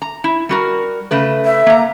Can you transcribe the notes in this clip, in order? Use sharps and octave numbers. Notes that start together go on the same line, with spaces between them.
A#5
E4
G3 F#4 A#4
C#3 A3 B4
E5
A#3 A#5